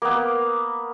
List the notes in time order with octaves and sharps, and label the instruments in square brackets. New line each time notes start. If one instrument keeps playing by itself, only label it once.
[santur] A#3 B3